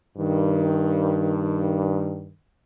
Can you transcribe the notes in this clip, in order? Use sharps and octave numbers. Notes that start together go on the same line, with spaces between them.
G2 D#3